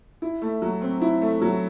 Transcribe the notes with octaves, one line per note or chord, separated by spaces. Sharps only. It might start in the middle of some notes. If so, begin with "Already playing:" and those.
E4
A3
F#3
C4
E4
A3
F#3